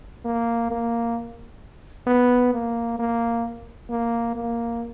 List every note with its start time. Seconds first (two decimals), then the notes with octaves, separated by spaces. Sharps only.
0.25 A#3
0.71 A#3
2.07 B3
2.53 A#3
2.99 A#3
3.90 A#3
4.35 A#3